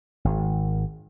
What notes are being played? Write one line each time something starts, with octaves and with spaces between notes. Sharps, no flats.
G#1